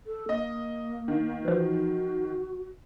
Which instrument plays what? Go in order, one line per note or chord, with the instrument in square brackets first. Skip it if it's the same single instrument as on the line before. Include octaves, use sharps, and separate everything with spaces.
[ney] A4
[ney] A#3 [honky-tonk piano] D#5
[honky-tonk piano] D#3
[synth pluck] E3 F3 [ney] F#4